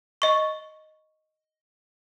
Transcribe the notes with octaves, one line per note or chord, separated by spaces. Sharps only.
D#5 C#6